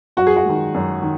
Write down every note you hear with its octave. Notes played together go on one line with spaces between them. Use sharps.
F#2 F#4
G#4
F#4
D#3 G#3
F#2
D#3